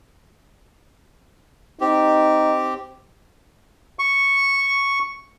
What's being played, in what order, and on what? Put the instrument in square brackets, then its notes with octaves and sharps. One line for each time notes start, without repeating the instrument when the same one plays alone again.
[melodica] C4 G4 [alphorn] D#4
[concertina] C#6